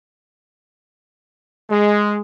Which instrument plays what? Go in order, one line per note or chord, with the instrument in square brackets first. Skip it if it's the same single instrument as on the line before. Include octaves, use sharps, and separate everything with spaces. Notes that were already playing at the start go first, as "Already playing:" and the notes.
[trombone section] G#3